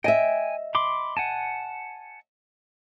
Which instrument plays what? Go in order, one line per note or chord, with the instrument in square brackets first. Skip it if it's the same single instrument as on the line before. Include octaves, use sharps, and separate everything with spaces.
[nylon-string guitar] D#5 E5 [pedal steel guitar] G5 G#5
[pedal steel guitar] B5 C6 D6
F#5 G#5 A5